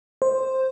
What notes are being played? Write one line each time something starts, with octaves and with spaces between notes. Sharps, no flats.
C5